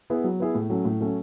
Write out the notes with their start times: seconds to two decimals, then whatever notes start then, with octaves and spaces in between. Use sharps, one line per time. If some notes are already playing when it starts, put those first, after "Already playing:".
0.10 B3 E4 G#4
0.24 F#3
0.40 B3 E4 G#4
0.55 A2
0.70 F#3 A3 C#4
0.85 A2
1.00 F#3 A3 C#4